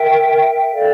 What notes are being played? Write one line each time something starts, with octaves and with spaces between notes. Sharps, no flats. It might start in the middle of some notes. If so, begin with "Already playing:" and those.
Already playing: A#4 E5 G5
A4 D5 F5